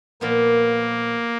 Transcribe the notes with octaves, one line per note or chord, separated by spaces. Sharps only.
A#2 F3 A#3 B3